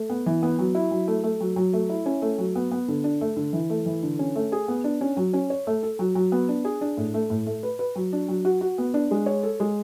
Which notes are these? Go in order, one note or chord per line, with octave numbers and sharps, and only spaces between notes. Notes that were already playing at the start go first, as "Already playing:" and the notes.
Already playing: A3
B3
E3
B3
F#3
E4
F#3
A3
A3
F#3
F#3
A3
E4
C#4
A3
F#3
B3
B3
D3
D4
A3
D3
E3
A3
E3
D3
C#4
A3
G#4
B3
D4
C#4
F#3
C#4
C#5
A3
A4
F#3
F#3
B3
D4
G#4
D4
A2
A3
A2
A3
B4
B4
F#3
D4
F#3
F#4
F#4
B3
D4
G#3
C#5
A4
G#3